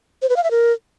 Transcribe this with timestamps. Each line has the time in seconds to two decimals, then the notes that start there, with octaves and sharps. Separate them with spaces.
0.22 C5
0.29 B4
0.37 F5
0.44 E5
0.51 A#4